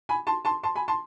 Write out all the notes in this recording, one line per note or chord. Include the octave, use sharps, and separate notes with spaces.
G#5 B5
A5 C6
A5 C6
A5 C6
G#5 B5
A5 C6